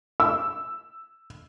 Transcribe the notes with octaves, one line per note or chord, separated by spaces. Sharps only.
E6